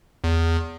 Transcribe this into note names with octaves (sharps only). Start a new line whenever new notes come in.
E2